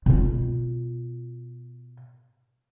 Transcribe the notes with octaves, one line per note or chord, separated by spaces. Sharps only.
B2 F4